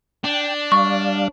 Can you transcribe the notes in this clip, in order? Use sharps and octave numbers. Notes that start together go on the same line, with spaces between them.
D4 G5
G3 D5 F5 C#6